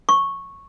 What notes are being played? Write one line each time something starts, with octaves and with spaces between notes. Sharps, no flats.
C#6